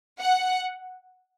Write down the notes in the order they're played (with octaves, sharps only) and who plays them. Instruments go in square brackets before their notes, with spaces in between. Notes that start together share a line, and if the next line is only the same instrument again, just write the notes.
[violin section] F#5